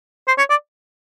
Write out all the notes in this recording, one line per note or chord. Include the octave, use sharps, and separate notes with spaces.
C5
C#5
D5